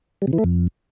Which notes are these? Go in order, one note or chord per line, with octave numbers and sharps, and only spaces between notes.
G3
C3
E3
A3
F2